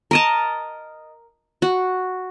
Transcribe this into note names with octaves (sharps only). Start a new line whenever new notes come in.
A#4 D#5 A5
F#4